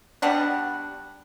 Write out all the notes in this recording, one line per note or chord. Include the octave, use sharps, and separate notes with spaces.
G3 B3 D4 F#4